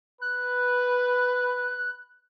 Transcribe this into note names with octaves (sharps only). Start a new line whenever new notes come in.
B4 F#6